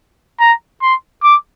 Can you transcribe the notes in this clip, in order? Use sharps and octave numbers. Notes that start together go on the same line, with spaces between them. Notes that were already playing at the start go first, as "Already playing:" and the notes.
A#5
C6
D6